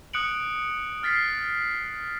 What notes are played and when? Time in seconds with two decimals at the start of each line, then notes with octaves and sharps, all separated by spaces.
0.13 D#6 F#6 C#7 D7 F#7
1.03 F6 A6 B6 C7